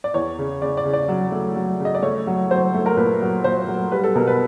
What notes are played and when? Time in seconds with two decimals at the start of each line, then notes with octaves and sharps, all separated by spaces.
0.04 D5
0.14 E2 C#5
0.38 C#3
0.62 C#3 D5
0.77 D5
0.85 C#3
0.93 D5
1.08 F#3
1.32 A3
1.56 F#3
1.80 C#3
1.85 D#5
1.95 D5
2.03 A3 C#5
2.27 F#3
2.51 F#3 C5
2.74 A3
2.86 A#4
2.97 A#2 B4
3.22 F#3
3.44 A#2 C5
3.68 F#3
3.92 G3 B4
4.04 A4
4.15 B2 A#4
4.27 B4